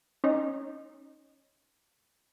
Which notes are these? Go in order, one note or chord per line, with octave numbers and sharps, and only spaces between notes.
C#4 D#4